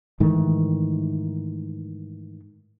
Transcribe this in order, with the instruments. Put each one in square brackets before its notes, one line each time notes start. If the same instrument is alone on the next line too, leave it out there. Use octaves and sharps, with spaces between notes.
[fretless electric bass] G#2 D#3 E3 A3